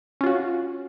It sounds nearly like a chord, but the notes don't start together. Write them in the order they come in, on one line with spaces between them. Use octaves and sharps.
C#4 F4 F#4